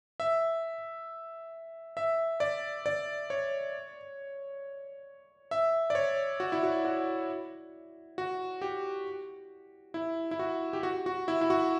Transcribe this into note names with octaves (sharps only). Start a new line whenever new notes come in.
E5
E5
D5
D5
C#5
E5
D5
C#5
F#4
E4
F#4
F#4
F#4
G4
E4
E4
F#4
G4
F#4
F#4
E4
E4
F#4